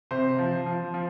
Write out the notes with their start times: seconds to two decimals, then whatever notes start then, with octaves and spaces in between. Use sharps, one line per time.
0.11 C3 C5
0.39 F3
0.66 F3
0.94 F3